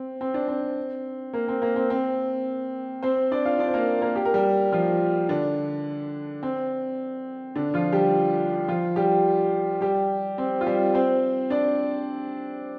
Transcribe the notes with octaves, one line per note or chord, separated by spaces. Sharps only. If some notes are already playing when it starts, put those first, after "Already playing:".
Already playing: C4
C4
D4
C4
A#3
C4
A#3
C4
C4
C4 C5
D4 D5
F4 F5
D4 D5
C5
A#3 A#4
A#3 A#4
G4
A#4
G3 G4
F3 F4
D3 D4
C4
D3 D4
F3 F4
G3 G4
F3 F4
G3 G4
G3 G4
C4
F4
G3 G4
C4 C5
D4 D5